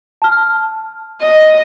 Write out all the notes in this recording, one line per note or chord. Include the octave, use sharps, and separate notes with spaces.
A5 F6
D#5